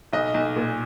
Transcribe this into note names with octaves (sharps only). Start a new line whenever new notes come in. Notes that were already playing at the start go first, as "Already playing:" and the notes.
B1 D#5
B1
A#2